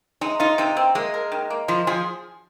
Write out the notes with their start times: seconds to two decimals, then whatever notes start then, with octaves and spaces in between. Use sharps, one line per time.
0.21 G#3 D#4
0.40 D#4 F4
0.58 C3 D#4
0.77 C4
0.95 G#3 A#3
1.14 A#4
1.32 D#3
1.50 A#3
1.68 F3 G#3
1.87 F3 G#4